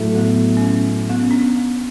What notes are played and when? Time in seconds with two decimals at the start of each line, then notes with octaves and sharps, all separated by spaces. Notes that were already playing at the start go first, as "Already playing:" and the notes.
Already playing: A2 F#3 A3
0.15 B3
0.57 C#4
1.10 B3
1.20 C#4
1.31 D4